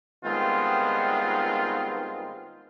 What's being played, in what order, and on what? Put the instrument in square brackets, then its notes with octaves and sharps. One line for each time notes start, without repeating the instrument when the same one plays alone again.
[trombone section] G2 D#3 G#3 B3 C4 F4